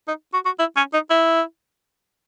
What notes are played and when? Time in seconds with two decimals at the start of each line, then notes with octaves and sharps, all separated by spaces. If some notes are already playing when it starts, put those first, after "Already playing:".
0.08 D#4
0.34 F#4
0.45 F#4
0.59 E4
0.77 C#4
0.93 D#4
1.10 E4